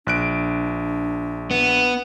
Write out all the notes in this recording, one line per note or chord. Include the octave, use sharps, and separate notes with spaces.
A#1 D4 F#6 D7
B3